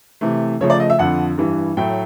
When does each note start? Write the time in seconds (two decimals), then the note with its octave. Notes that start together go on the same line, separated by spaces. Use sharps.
0.21 C3 E3 A3
0.61 C#3 F3 A3 C#5
0.70 D5
0.80 D#5
0.90 E5
0.99 F2 D3 F3 F#5
1.38 G2 E3 G3
1.77 A2 F#3 A3 G5